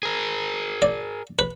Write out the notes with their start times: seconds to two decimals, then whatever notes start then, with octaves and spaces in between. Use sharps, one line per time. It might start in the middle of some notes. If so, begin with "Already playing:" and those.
0.03 G#4 A#4
0.82 D5
1.39 B4